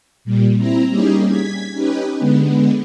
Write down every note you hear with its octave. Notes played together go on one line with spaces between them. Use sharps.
A#2 G3
C4 E4 A#5
G3 A#3 C#4 D#4 G4 G#4
G#6 B6
C#4 D#4 G4 B4
D3 G#3 B3